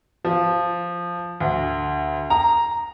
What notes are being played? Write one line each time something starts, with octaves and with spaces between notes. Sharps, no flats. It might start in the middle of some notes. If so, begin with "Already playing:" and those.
F3
D2
A#5